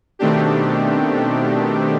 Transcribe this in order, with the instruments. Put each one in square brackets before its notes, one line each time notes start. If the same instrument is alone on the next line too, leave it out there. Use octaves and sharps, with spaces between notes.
[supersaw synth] B2 D#3 A3 C4 D4 G4